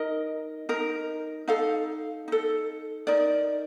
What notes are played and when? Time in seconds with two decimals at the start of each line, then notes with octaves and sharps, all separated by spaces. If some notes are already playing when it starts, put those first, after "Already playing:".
Already playing: D#4 A#4 D#5
0.69 D#4 A#4
1.48 D#4 A4 F5
2.28 D#4 A4
3.07 D#4 A#4 D5